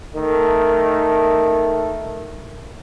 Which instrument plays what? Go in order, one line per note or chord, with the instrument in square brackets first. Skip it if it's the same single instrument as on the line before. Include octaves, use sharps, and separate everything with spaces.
[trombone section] D#3 A3